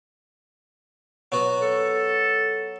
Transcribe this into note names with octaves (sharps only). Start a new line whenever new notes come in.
F#3 B3 F#4
A4